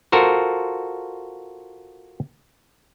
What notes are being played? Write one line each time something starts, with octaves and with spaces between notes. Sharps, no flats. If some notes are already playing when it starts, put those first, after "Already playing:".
F4 F#4 A4 A#4 C5